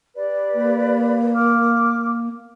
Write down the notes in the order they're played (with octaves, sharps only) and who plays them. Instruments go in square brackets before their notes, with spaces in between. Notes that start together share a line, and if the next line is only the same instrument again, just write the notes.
[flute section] G4 B4 D5
[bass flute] A#3
[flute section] D6 F6